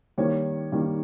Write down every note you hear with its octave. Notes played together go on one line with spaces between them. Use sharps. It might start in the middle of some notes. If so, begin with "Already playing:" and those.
D#3 G3 A#3 C#5
D#3 G3 A#3